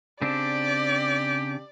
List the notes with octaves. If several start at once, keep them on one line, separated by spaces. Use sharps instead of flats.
C#3 C4 D4 G4 D5